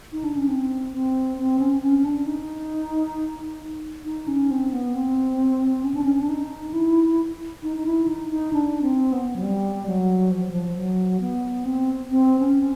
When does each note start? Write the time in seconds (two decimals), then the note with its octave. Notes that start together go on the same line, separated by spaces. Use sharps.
0.12 D#4
0.24 D4
0.36 C#4
0.48 C4
0.93 C4
1.38 C4
1.59 C#4
1.83 C#4
1.99 C#4
2.05 D4
2.26 D#4
4.05 D#4
4.28 C#4
4.51 C4
4.73 B3
4.94 C4
5.84 C#4
5.94 D4
6.03 C#4
6.15 C#4
6.21 D4
6.29 D#4
6.73 E4
7.63 D#4
7.77 D#4
7.86 E4
8.08 D#4
8.30 D#4
8.53 D4
8.82 C4
9.12 B3
9.36 F#3
9.42 G3
9.87 F#3
10.31 F3
10.42 F#3
10.51 F3
10.76 F#3
11.20 B3
11.65 C4
12.10 C4
12.39 C#4